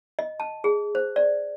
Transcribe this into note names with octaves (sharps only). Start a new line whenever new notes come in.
D#5
A5
G#4
C5
D5